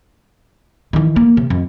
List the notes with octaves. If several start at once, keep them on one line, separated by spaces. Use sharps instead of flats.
D#3 E3
A#3
C3
F2